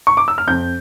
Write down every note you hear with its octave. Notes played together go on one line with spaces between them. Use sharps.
C#6
D6
E6
F6
F2 G6